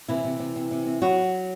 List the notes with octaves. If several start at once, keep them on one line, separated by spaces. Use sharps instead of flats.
C3 E3 E4
C3
C3
C3
C3
C4
F#3 B3 F#4